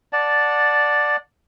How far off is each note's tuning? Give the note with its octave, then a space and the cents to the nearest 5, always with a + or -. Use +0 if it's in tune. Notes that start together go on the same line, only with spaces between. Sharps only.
D5 +0 F#5 -20 A5 +0